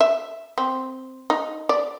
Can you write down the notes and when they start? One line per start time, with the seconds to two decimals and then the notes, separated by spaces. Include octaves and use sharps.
0.01 E5
0.58 C4
1.30 D#4
1.69 D5